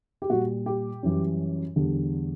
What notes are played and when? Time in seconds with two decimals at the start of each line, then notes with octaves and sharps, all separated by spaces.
0.22 G4
0.30 A#2 G3 F#4
0.66 G4
1.03 F#2 E3 G3
1.76 E2 D3 G3